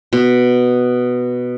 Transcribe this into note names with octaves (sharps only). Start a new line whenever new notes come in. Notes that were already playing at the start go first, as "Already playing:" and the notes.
B2